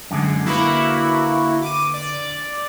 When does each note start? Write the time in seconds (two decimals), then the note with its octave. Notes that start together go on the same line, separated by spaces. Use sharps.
0.11 F#2 D3 G#3
0.46 D3 A#3 E4 F#4 B4
1.62 D6 D#7
1.94 D5